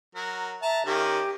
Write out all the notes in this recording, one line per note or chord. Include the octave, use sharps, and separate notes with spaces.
F#3 A#4
E5 A5 A#5
D#3 A#3 C#4 G4